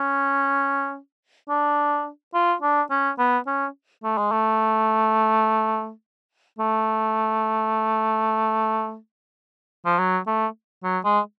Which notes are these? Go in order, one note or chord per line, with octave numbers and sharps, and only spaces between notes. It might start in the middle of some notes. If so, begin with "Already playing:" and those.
Already playing: C#4
D4
F4
D4
C#4
B3
C#4
A3
G#3
A3
A3
F3
F#3
A3
F#3
G#3